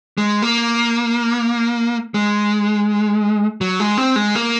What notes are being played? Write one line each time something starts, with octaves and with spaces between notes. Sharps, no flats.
G#3
A#3
G#3
F#3
G#3
C4
G#3
A#3